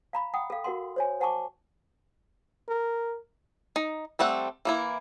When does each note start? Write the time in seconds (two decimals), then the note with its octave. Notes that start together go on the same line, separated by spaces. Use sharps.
0.13 F5 A#5 B5
0.34 F#5 G5 D#6
0.50 A4 F5
0.64 F#4 A#4 F#5 C6
0.96 C5 C#5 G#5
1.20 C5 F#5 G#5 A5 C#6 D6
2.68 A#4
3.76 D#4
4.19 G3 A3 C4 F#5
4.65 E3 A#3 E4